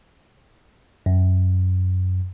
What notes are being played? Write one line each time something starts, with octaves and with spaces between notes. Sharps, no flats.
F#2